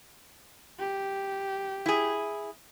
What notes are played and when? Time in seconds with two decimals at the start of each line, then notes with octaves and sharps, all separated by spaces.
0.79 G4
1.86 E4 G#4